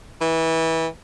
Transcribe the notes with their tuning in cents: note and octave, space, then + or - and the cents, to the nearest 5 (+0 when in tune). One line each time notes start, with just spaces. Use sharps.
E3 -20